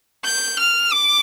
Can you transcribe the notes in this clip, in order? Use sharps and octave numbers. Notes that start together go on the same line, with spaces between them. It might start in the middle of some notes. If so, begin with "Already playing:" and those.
G6
F6
D6